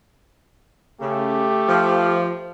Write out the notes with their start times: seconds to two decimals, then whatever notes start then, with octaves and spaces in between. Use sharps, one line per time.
1.01 C#3 A3 G4
1.68 F3